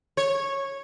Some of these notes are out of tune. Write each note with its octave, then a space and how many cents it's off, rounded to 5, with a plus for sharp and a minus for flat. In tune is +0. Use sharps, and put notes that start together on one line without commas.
C#5 -10